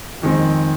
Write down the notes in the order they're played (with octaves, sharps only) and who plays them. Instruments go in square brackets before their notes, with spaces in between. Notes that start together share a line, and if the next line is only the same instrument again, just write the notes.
[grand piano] F2 D#3 G#3 C4